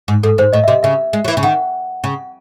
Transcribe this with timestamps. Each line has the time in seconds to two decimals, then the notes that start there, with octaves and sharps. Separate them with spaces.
0.08 G#2
0.23 G#2 A4
0.38 G#2 C5
0.53 A2 D#5
0.64 E5
0.68 C3 D#5
0.83 C#3 E5
1.13 G#3
1.24 F#3
1.28 E3
1.37 C#3
1.43 D#3 F#5
2.04 C#3